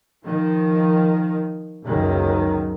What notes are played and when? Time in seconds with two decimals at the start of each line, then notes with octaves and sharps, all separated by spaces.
0.25 D#3 F3
1.85 F#1 C#2 F#2 D#3